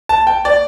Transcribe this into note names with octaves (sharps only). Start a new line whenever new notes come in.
A5
G5
D5